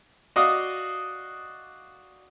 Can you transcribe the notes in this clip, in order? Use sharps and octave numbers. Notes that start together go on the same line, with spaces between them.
F#4 D5 D#5 F5 D#6